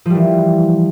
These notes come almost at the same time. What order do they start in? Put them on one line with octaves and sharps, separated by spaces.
F3 G3 E3